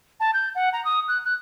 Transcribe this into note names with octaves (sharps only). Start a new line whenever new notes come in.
A5
G6
F#5
A#5
D#6
F#6
F#6